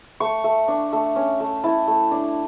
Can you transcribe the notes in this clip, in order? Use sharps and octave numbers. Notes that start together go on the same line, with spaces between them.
A3 C#6
A3
D4
A3
C#4
A3
E4 A5
A3
D4